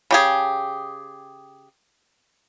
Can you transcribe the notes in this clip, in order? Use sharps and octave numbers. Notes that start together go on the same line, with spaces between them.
C#3 G4 G#4